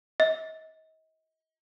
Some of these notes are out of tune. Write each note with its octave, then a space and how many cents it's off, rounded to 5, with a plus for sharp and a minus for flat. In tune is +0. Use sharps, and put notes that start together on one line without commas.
D#5 +35